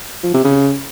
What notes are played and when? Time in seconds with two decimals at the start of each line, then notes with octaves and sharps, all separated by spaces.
0.23 F3
0.34 C3
0.45 C#3